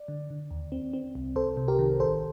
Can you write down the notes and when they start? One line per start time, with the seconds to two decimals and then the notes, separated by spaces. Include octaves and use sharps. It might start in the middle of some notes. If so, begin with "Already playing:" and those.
Already playing: D5
0.08 D3
0.30 D3
0.51 D#2
0.72 C4
0.93 C4
1.15 C2
1.36 C2 A4 C5
1.57 C3
1.68 G4 A#4
1.79 D#3
2.00 A1 A4 C5